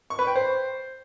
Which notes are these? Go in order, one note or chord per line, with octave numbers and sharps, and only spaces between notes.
C#6
B4
G5
C5